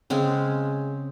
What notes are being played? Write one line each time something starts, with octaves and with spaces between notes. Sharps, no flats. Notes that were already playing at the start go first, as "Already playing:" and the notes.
C#3 G#3 C4